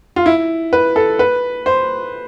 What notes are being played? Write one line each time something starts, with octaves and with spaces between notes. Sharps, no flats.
F4
E4
B4
A4
B4
C5